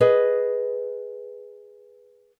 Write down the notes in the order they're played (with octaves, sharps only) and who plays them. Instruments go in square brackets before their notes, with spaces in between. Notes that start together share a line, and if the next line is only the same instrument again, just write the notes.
[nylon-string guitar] G#4 B4 D#5